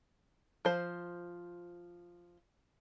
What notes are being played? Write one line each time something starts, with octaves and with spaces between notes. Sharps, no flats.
F3 C5